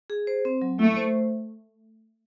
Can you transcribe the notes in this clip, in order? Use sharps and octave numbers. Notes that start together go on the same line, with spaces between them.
G#4
C5
C4
F#3
A3 E4
C5